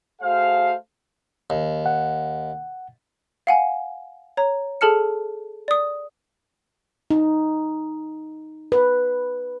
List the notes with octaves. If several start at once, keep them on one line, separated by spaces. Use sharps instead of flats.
A3 F#4 G#4 C5 F5
D#2
F#5
F5 F#5 G#5
C#5 A#5
G#4 A4 A5 F6 C#7
D5 D#6
D#4
B4